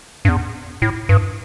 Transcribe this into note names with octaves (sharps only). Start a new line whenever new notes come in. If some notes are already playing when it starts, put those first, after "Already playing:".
G2
E2
A2
G2